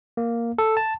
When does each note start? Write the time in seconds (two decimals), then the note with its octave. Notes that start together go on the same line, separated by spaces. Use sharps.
0.17 A#3
0.58 A4
0.77 A5